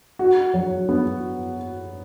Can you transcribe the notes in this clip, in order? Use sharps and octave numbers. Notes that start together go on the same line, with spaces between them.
F#4
F#3
B3